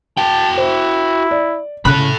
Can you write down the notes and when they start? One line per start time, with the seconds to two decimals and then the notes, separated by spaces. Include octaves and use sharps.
0.17 F#4 G5 A5
0.57 E4 C5
1.31 D5
1.85 C#3 A4 B5 F#6